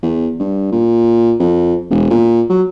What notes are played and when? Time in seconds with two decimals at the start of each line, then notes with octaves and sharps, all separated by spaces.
0.02 E2
0.40 G2
0.72 A#2
1.39 F2
1.90 E1
2.10 A#2
2.49 F#3